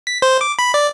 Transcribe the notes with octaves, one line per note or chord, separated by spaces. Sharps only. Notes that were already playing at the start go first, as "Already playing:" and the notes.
B6
C5
D6
B5
D5